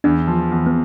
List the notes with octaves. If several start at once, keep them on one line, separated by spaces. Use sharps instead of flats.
E2 D4
F3
E2
B3